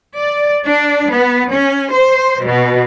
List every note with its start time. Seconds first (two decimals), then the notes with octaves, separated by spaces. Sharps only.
0.15 D5
0.65 D4
1.10 B3
1.51 C#4
1.91 C5
2.44 B2